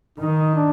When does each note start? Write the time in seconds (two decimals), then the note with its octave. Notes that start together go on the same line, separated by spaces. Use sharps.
0.18 D#3 D#4
0.55 D4